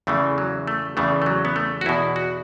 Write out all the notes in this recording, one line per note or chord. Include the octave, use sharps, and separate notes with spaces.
E2 C#3 E3 A3
F#3
A3
E2 C#3 E3 A3
A3
F#3
B3
A3
F#4
E2 B2 E4
F#4